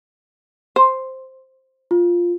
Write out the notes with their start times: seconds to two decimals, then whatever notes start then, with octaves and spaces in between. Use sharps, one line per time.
0.76 C5
1.91 F4